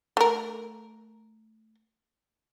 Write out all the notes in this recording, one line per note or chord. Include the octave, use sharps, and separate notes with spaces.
A3 A#4